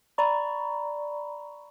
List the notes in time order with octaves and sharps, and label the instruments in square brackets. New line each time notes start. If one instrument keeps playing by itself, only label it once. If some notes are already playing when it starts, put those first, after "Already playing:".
[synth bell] D5 A#5 B5 C#6